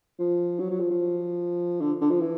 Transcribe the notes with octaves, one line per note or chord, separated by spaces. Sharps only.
F3
F#3
F#3
F3
F3
D3
D3
F3
E3